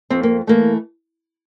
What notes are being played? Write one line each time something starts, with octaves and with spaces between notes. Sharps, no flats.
F2 C4
A#3
E3 A3 A#3